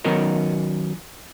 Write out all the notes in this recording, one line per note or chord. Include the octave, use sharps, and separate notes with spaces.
D#3 F#3 B3 C#4 D#4 A#4